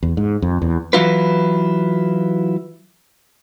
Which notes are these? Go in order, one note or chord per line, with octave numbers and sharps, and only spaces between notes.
E2
G#2
F2
E2
E3 F#3 E4 F4 B4